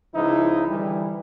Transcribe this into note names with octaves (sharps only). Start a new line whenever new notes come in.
C#2 F3 D#4 E4
D3 E3 G3